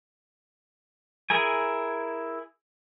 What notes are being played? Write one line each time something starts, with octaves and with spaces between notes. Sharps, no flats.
E4 G#4 A#4 G#5